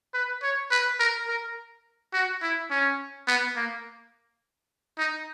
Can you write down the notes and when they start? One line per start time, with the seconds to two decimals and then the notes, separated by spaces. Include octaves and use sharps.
0.14 B4
0.43 C#5
0.71 B4
1.00 A#4
1.28 A#4
2.13 F#4
2.42 E4
2.71 C#4
3.28 B3
3.56 A#3
4.98 D#4